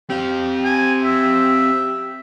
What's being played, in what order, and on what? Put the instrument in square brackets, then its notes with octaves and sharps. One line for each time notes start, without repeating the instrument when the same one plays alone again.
[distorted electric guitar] C4 F5 [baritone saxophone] G4
[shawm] G#5
E5